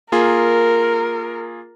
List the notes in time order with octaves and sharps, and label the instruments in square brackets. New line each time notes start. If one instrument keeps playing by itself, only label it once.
[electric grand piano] A#3 F4 G#4 [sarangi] A#4